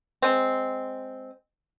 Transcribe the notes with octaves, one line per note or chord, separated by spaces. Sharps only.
G#3 C4